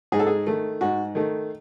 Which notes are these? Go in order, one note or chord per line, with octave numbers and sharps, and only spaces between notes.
G#2 G#4
A4
G#4
D#3 A3
G#2 F#4
D#3 A3